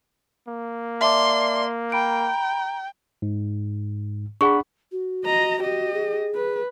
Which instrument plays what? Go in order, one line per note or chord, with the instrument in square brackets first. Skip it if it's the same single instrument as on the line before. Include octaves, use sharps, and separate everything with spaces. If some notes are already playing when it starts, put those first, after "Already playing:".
[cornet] A#3
[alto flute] D5 [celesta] E5 A5 D6 [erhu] C6
[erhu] G5 [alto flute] A#5 [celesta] B5 D7
[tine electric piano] G#2
[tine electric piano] D4 F#5 B5 [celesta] G#4 C#6
[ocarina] F#4
[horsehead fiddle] D#5 A#5
G4 D#5
[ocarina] G#4
[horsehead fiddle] B4